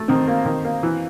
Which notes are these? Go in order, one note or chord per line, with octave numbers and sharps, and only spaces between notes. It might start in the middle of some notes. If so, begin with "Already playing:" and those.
Already playing: A3
D#3 C4
A#3
D#3
A#3
E3